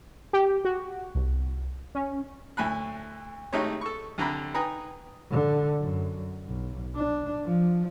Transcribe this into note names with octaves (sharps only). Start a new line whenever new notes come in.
G4
F#4
C2
C#4
D2 A2 G#5 B5 F#6
G#1 A3 D#4 G4 C#5
A4 C#6
C2 D3 A#5 B5
D#4 B4 G5 G#5 A#5 D#6
D3
F#2
B1
D4
F3